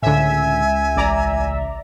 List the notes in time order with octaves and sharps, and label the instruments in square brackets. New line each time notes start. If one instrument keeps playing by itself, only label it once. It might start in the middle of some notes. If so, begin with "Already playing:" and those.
[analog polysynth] C#2 E5 [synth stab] A2 D3 [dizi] G#5
[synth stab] A1 D5 A#5